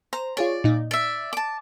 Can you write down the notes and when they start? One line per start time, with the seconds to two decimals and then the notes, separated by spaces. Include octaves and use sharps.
0.13 C5 A#5
0.37 F4 G#4 C#5 D5
0.64 A#2 D#4
0.91 D5 E5
1.33 A5 D6